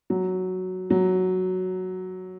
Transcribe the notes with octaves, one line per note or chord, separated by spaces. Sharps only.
F#3
F#3